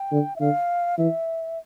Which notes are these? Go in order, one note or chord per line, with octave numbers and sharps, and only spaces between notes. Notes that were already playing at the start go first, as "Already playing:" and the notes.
Already playing: G5
D3
E5
D3 F5
E3 E5